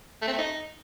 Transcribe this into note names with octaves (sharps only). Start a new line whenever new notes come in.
A3
C4
A3
D#4